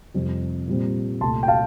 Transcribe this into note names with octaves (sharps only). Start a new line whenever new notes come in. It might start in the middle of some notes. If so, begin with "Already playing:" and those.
F2 C3 G3 C4
A#2 G3 C4
C2 A#2 A3 A5 C6
G5
F5 A5